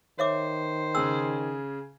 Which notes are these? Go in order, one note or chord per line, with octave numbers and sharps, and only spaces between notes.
D#3 C5 C#5 E5 D6
C#3 G#4 E6